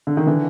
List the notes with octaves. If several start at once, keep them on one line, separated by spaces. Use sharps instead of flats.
D3
D#3
D3 E3